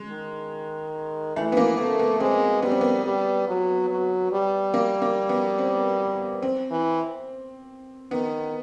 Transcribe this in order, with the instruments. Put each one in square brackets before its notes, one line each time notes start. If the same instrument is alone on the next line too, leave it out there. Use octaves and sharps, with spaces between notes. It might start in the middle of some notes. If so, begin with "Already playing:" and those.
Already playing: [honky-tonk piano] G#3
[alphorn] D#3
[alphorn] E3 [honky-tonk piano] A3
[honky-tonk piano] B3
A#3
[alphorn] A3 [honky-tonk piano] B3
[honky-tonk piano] B3
[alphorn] G#3 [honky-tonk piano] C4
[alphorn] G3 [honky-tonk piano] B3
[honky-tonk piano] C4
B3
[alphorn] G3
F#3
F#3
G3
[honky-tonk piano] A#3
A#3
B3
C4
C4
[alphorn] E3
[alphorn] D#3 [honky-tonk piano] B3